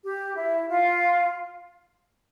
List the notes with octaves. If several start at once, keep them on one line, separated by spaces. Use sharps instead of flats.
G4
E4
F4